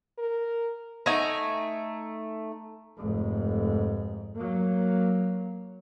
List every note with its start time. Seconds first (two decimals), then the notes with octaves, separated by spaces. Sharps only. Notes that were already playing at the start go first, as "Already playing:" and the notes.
0.18 A#4
1.06 A3 D#4 G#5 A#5
2.97 F1 G#2
4.35 F#3 A#3